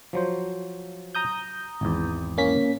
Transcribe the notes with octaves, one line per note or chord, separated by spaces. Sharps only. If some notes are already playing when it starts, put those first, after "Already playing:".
F3 F#3 C5
A#5 D#6 G6
G#1 E2
A#3 C#4 B6